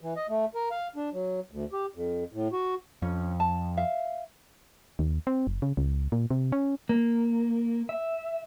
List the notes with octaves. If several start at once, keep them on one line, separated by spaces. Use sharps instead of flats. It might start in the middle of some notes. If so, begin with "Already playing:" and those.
E3
D#5
A3
A#4
F5
D4
F#3
D2
G4
F2
A2
F#4
F2 C#4
A5
E5 F5
D#2
C4
F#1
C#3
C#2
A#2
C3
C#4
A#3
E5